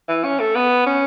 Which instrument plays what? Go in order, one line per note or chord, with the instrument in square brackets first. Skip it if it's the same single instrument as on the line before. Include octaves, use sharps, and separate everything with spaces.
[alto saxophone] E3
C#4
A3
B3
C#4